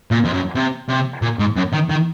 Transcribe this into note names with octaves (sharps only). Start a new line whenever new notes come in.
A#2
F2
F#2
C3
C3
A#2
G#2
F#2
D#3
D#3